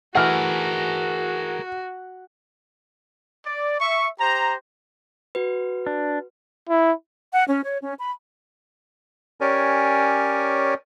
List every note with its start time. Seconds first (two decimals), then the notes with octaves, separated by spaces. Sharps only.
0.15 E3 A3 F#4 G#4 A#4 F#5 F6
3.45 D5
3.80 E5 C#6
4.20 G4 C5 A#5
5.35 F#4 B4
5.86 D4
6.69 E4
7.33 F#5
7.48 C#4
7.64 C#5
7.83 C#4
8.00 B5
9.41 C#4 G4 A#4 C#5 D5 G#5